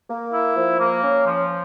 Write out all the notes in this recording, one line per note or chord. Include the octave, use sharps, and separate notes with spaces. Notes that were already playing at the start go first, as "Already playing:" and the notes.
A#3
E4
F3
A#3
C#4
F3